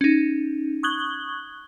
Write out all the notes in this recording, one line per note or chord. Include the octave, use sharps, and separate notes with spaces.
C#4 D#4
C#6 D#6 F#6 G#6 F#7 G7